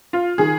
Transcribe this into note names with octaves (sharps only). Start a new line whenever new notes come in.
F4
D#3 G#4